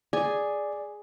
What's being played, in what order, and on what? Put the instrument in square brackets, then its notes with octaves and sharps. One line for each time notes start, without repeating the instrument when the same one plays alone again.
[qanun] G#4 G#5 [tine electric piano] D5